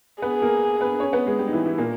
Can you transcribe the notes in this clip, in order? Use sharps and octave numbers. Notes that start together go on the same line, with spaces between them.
B3 G#4 B4
A#3 A#4
B3 B4
C#4 C#5
B3 B4
G#3 G#4
G3 G4
D#4
E3 E4
E3 E4
A#2 A#3